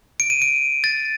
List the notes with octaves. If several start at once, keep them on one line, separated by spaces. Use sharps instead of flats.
D7
D#7
D7
A6